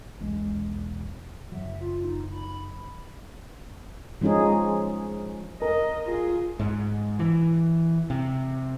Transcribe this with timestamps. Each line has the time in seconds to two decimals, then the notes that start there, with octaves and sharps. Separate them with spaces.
0.21 E1 B1 G#3
1.52 F#1 F#3 E5
1.81 F4
2.04 D#4
2.31 B5
4.21 F3 G#3 C#4 D#4 G#4
5.62 A#4 D#5
6.05 F4 G#4
6.60 G#2
7.19 E3
8.10 C3